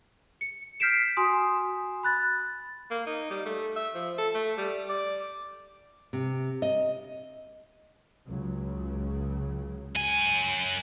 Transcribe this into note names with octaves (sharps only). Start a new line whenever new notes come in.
C#7
F6 G6 B6 C7 D7 E7
F#4 G#5 C6 D#6
B5 F#6 A6
A#3
D#4
G3
A3
E5
F3
A4
A3
G3
D5
C3
D#5
C#2 C#3 F#3
F#2 G#5